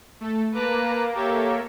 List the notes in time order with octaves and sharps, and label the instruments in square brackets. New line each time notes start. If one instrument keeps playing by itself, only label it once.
[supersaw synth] A3 A4
[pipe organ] A#3 [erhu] B4 [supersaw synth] A5 A#5 D6
[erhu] G4 [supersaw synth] A4 C#5 E5